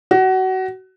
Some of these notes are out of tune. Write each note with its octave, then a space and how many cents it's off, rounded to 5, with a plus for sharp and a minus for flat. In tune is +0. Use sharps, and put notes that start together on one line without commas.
F#4 +25